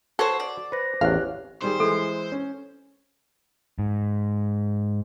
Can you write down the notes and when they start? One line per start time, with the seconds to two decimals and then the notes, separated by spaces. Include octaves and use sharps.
0.19 F#4 A4 C5 C#5 C6
0.40 D5
0.72 B4 C5 A#6
1.01 A1 E2 A2 G4 C#5 F5 F#6
1.62 D#3 G3 G#4 C5
1.80 E3 G#3 A4
2.32 C#4
3.79 G#2